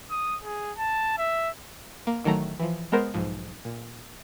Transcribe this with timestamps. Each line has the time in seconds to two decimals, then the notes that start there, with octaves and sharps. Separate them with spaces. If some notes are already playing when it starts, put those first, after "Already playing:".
0.11 D#6
0.44 G#4
0.78 A5
1.18 E5
2.07 A#3
2.24 A1 D#3 F#3 A3 A#5
2.60 E3 F3
2.92 G#3 B3 A#4 C5
3.14 B1 G#2 F3
3.65 A#2